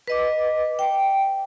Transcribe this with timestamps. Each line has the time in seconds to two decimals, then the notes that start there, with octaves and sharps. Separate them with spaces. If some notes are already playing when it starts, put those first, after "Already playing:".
0.08 B4 D#5 D6
0.79 G5